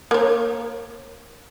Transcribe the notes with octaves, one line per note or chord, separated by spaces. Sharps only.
A#3 C#5